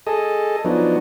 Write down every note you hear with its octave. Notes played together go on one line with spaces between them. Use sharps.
G#4 A4 D#5
F3 F#3 B3 D4 D#4